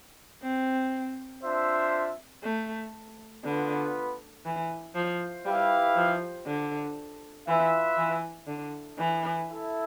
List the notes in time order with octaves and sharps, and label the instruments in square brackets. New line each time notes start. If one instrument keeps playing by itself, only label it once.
[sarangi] C4
[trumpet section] D4 F4 C5 E5
[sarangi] A3
[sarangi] D3 [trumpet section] B3 F4 B4
[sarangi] E3
F3
[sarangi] G3 [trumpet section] E4 G4 B4 F5
[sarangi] F3
D3
[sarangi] E3 [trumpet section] F4 B4 E5
[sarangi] E3
D3
E3
[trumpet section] E4 A4 E5